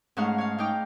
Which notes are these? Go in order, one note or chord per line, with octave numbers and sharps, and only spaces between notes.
G#2 A3 C#4 D#4 F5 F#5
C#5 F5
D#4 F5 G5 D6